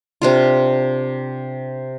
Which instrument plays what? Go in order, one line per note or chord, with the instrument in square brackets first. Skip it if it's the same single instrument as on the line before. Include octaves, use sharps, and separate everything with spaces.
[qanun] C3 D4 F4